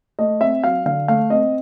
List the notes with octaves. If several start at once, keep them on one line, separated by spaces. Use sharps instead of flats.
A3 D#5
C4 E5
F#3 F5
D3 F5
A3 F5
C4 D#5